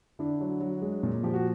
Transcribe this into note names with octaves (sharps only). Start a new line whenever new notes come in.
D3 D4 E4
F#3
F#3
G#3
A#2
F3 G4
F#4